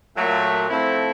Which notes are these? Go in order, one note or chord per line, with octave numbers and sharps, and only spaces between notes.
A#2 F#3 A3
F3 A3 C4 E4